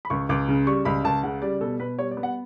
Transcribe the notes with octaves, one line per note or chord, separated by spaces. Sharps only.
B5
C#2 C#6
C#2 D6
C#3
G3 C#6
C#2 B5
C#2 A5
C#3 F#5
G3 D5
B2 A4
B2 B4
G3 C#5
D5
B3
F#5